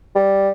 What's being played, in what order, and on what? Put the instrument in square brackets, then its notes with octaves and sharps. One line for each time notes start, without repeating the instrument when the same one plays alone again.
[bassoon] G3